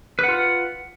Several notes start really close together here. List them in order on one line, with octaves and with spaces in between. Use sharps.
B4 F#5 F4